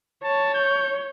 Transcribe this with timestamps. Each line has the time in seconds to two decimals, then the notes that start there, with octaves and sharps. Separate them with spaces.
0.24 C#5 A5
0.54 G6